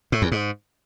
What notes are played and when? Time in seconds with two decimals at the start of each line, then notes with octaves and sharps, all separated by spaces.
0.12 A2
0.22 E2
0.32 G#2